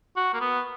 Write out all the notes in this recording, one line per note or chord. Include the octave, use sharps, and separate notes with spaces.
F#4
A#3
B3